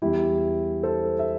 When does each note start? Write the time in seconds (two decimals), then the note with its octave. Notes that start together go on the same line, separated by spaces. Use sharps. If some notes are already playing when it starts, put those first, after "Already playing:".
0.02 E2 E3 G3 E4 G4
0.83 A4 C5
1.19 E5